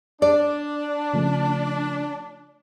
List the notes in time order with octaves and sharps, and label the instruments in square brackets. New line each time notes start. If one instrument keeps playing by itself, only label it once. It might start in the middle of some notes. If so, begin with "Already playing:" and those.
[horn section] D4 [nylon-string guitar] D5
[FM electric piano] C#3 F3 A3